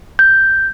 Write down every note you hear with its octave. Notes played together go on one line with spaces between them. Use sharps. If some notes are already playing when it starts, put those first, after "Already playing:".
G6